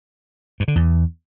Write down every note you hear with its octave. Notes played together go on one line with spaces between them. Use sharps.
G2
D3
E2